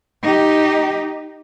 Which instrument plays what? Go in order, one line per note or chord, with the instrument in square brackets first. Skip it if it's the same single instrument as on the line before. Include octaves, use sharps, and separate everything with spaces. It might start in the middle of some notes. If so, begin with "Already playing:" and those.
[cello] D#4 G4